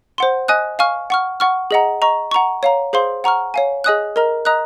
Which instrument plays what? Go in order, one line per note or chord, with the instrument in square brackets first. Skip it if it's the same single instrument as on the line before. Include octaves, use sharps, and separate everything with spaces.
[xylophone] C5 F#5 C6
D#5 G#5 D#6 F#6
F5 G#5 C#6 F6
F#5 C#6 F6
F#5 C#6 F6
G#4 D#5 F#5 A#5
D#5 A#5 C#6
F#5 A#5 C#6
C#5 F5 A#5
G#4 C5 F5 C6
F#5 A#5 C#6 F6
C#5 F5 G#5
G#4 D#5 G#5 D#6 F#6
A#4 D#5 A#5 F6
D#5 A#5 D#6 F#6